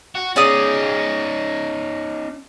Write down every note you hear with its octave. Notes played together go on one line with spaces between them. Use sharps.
F#4
C#4 D#4 G#4 D5 D#6